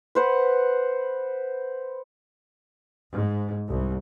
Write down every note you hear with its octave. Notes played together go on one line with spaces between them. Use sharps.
B4 C5 F#5
G#2
C2